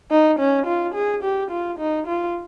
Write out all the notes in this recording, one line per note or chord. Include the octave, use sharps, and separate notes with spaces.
D#4
C#4
F4
G#4
G4
F4
D#4
F4